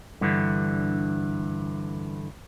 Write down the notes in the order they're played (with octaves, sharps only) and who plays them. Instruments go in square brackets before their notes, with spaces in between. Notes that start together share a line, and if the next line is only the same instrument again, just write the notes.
[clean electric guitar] G2 D3 E3